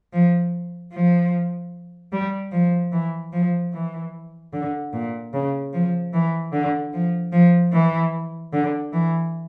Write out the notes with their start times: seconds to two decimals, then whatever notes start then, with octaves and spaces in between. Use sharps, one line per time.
0.13 F3
0.92 F3
2.12 G3
2.52 F3
2.92 E3
3.33 F3
3.73 E3
4.53 D3
4.93 A#2
5.33 C#3
5.73 F3
6.13 E3
6.52 D3
6.93 F3
7.32 F3
7.72 E3
8.53 D3
8.93 E3